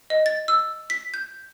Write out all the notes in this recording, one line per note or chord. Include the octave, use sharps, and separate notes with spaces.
D#5
A6
E6
B6
G6